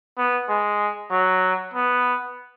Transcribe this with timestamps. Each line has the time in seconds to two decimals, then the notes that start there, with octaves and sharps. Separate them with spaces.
0.18 B3
0.49 G#3
1.11 F#3
1.74 B3